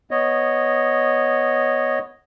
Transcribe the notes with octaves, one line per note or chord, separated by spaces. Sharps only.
B3 C#5 D#5